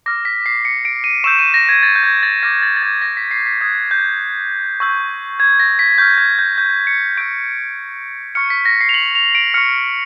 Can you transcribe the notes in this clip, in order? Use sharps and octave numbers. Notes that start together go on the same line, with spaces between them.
D6 F6 A#6
B6
C7
C#7
D7
D#7
C#6 E6 G6 E7
D#7
A#6
G#6
A6
G6
G#6
A6
D6 F6 A#6
A6
A6
G#6
A#6
B6
C7
B6
D#6 F#6 G#6
G6
C#6 E6 G6
G#6
A#6
B6
C#6 F6 G6
G#6
G6
G6
C#7
C#6 E6 G6 D7
C#6 F6 C#7
B6
A#6
C7
F7
F#7
F7
D7
C#6 F6 C#7